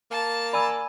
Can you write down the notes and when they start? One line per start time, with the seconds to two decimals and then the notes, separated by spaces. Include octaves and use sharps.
0.11 A#3 A5
0.53 D5 G#5 B5 E6